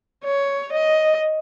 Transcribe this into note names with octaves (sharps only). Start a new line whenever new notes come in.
C#5
D#5